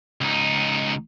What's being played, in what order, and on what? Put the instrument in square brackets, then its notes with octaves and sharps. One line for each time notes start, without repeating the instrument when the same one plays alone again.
[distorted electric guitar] C#2 D#4